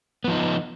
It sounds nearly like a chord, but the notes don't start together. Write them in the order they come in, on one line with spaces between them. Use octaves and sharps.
B3 F3 D#4